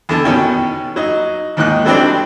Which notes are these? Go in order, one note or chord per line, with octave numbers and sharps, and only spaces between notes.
E2 D3 A5
B2 D#3 C#4 G4
F#3 D#4
D#2 G#2 D#3 D#4 F#6
D3 E3 F#3 G3 C4 D4